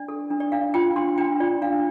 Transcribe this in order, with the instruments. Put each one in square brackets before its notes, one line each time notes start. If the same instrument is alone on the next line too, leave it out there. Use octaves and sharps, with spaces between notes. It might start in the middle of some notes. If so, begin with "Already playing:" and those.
Already playing: [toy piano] D4 D5
A4
D4
D5
D4 F5
F4 G5
D4 C6
D4 G5
F4 D5
D4 F5